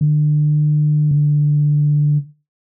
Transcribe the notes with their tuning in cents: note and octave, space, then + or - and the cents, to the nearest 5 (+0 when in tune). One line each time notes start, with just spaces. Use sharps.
D3 +35
D3 +5